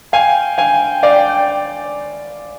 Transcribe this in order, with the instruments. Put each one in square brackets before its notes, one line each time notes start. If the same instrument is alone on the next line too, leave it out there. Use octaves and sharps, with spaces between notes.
[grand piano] F5 G#5 [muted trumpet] G5
[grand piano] F5 G#5
D5 F5